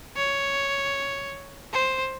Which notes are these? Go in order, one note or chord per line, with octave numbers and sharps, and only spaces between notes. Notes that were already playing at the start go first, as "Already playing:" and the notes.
C#5
C5